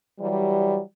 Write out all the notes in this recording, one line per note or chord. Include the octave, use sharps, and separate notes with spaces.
E3 F#3 G3